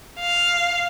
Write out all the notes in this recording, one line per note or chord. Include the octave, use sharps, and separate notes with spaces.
F5